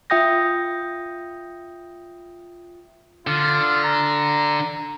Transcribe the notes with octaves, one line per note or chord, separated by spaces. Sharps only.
F4 E5 G5 D#6 G6 A#6
D3 F4
A#5